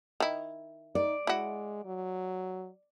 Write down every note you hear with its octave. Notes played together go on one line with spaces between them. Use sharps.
D#3 E4
D#4 D5
G#3 E4 F#4
F#3